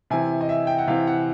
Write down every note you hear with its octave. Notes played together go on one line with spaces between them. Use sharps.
C3 E3 G#5
D#5
E5
G5
F#5
C3 E3 F5
F#5